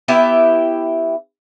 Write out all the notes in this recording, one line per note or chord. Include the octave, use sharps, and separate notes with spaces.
B3 E4 G4 E5